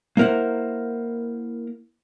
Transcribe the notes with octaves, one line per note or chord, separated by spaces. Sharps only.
A#3 E4 A#4 C5 F#5